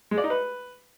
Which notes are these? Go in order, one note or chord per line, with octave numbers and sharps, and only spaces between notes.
G#3
D5
D#4
B4